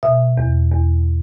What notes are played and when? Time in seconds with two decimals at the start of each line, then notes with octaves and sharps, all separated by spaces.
0.03 B2 E5
0.38 E2
0.72 E2